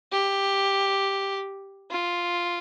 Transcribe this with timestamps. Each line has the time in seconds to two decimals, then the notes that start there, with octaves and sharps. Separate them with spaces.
0.12 G4
1.91 F4